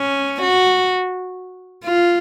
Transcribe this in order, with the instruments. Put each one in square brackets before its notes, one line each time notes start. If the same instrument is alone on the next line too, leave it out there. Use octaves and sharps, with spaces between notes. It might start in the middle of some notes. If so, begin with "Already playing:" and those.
Already playing: [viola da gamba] C#4
F#4
F4